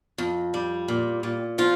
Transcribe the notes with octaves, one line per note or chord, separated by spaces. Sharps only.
F2
G3
A#2
A#2
F3 F4